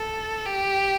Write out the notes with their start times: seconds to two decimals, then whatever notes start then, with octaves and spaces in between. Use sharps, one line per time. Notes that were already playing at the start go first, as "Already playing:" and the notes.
Already playing: A4
0.46 G4